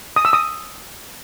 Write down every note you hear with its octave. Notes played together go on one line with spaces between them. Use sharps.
D#6
E6
D#6